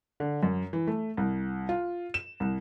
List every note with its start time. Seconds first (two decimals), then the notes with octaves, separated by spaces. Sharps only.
0.20 D3
0.43 F#2
0.73 E3
0.87 A3
1.17 C2
1.69 F4
2.14 E7
2.40 C2